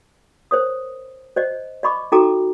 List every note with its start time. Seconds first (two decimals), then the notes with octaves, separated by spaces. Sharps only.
0.51 A#4 C5 C#5 D#6
1.36 C5 D5 D#5
1.83 D5 D#5 B5 C#6 D6
2.12 D#4 F#4 A4 G5 A#5 D6